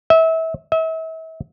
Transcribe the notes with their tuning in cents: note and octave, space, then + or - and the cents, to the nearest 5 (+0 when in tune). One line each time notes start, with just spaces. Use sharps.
E5 -30
E5 -40